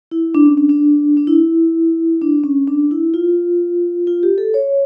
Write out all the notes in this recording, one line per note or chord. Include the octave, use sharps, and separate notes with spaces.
E4
D4
C#4
D4
D4
D4
E4
D4
C#4
D4
E4
F4
F4
G4
A4
C#5